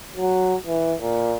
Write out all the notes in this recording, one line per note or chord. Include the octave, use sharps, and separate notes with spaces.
F#3
E3
A#2